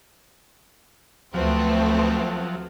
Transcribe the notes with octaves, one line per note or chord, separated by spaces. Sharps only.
D2 F3 F#3 A3 B3 C4